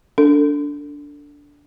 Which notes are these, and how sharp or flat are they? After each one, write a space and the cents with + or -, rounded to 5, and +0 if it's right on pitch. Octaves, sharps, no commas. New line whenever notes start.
D4 -15 A4 +25